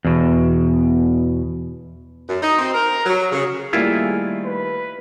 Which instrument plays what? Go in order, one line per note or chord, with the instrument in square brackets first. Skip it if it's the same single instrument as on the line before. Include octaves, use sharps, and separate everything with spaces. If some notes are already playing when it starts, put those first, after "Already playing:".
[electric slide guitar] E2 B2
[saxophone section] F#2
D#4
C4
A#4
F#3
C#3
[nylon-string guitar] D#3 A#3 [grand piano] G3 A3 G4 [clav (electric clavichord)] E4 F4 [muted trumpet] G#4
[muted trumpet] B4